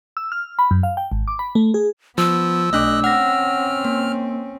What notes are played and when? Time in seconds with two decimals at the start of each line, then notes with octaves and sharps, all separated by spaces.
0.17 E6
0.32 F6
0.59 B5
0.71 F#2
0.83 F5
0.97 G5
1.12 G#1
1.28 D6
1.39 B5
1.55 A3
1.74 G#4
2.18 F3 B3 E6
2.73 B1 A3 D4 D#5 D6 F#6
3.04 C4 C#4 F#5 F6 A#6
3.85 A#3